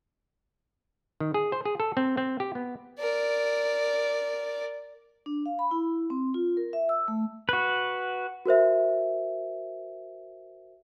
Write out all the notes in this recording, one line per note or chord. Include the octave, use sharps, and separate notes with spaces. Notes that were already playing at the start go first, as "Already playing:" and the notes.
D#3
G#4
C5
G#4
A4
C4
C4
G4
B3
A#4 D5
D4
F5
B5
E4
C4
F4
A#4
E5
E6
A3
F#4 B4
F#4 A#4 C5 E5